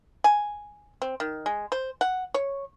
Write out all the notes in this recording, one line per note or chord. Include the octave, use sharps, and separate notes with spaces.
G#5
C4
D#3
G#3
C5
F#5
C#5